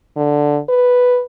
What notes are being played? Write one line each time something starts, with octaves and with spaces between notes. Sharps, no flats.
D3
B4